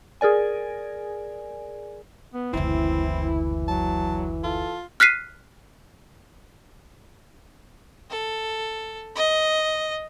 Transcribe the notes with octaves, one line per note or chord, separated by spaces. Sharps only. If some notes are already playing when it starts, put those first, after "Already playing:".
G#4 A#4 D5 G#5
B3
F#1 D2 E3 C4 E4
F#3 A5
F4 A4
F6 F#6 B6 C7 D#7
A4
D#5